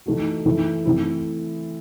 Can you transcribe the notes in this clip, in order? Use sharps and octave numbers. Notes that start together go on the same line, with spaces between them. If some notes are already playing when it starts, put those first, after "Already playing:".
E3 A3 D#4 F#4
E3 A3 E4
E3 A3 C4 E4